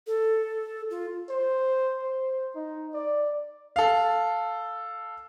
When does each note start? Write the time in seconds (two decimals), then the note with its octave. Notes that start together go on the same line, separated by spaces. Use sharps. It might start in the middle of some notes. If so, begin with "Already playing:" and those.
0.07 A4
0.90 F4
1.29 C5
2.03 C5
2.55 D#4
2.94 D5
3.76 A4 F5